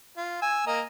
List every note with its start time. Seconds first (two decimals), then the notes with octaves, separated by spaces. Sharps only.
0.17 F4
0.42 G#5 E6
0.67 A#3 A#4 D#5